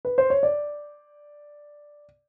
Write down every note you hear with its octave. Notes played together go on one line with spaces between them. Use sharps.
B4
C5
C#5
D5